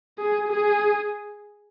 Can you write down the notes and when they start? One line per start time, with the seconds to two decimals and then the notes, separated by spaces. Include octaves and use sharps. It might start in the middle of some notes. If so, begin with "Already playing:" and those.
0.19 G#4
0.48 G#4